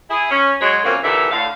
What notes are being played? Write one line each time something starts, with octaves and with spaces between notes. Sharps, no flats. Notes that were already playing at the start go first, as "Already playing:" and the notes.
E4 G#4
C#4
F#3 G#3 C#5
F#2 A#2 D3 A#3 C4 C#4
D#2 A#2 D3 E3 E5
A2 D3 F5